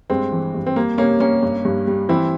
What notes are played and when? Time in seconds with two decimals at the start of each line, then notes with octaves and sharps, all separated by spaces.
0.10 G2 G#3 C4
0.32 E3
0.54 G2
0.66 C4
0.76 G3 A#3
0.98 C3 A#3 C#4
1.20 G3 A#3 C#4
1.43 G2
1.65 G2
1.87 G3
2.09 E3 C4 E4